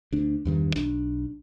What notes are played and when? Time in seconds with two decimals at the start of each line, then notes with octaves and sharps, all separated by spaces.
0.13 D2 D4
0.45 E2 G2 D#3 E3
0.75 B1 D4